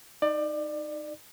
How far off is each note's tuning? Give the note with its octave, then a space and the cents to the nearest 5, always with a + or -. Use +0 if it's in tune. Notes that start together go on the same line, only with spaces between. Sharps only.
D#4 +0 D5 +25